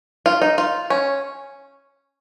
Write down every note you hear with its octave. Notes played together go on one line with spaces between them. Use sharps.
F4
D#4
F4
C#4